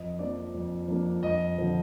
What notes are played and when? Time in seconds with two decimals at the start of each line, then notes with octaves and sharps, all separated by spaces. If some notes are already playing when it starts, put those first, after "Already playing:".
Already playing: F2 D#5
0.19 F3 A#3 D4 D5
0.54 F2
0.88 F3 A#3 D4
1.23 F2 D#5
1.58 D3 F3